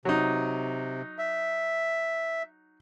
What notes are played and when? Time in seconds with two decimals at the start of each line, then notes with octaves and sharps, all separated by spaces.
0.05 C3 F#3 D#4
1.18 E5